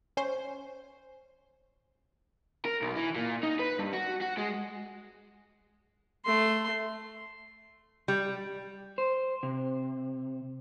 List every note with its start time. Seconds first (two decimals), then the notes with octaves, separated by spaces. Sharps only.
0.17 C#4 C5
2.65 A#4
2.82 B1
2.96 E3
3.16 A#2
3.43 D#4
3.59 B4
3.79 G2
3.93 F#4
4.21 F#4
4.37 G#3
6.25 A3 C6
8.08 G3
8.98 C5
9.43 C3